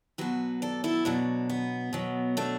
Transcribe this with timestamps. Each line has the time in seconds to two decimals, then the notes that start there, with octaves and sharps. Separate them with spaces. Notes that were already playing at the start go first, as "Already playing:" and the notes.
0.18 B2 F#3 F#4 B4
0.62 A4 D5
0.84 E4 A4
1.05 B2 F#3 D4 F#4
1.50 B3
1.93 B2 F#3
2.37 A3 D4